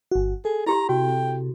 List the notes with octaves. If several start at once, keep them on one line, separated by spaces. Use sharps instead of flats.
G1 F#4
G#4 A4
E4 G4 A#5 C6
C3 F#4 G5